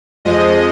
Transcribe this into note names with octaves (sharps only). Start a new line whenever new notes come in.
F2 F3 G#3 D#5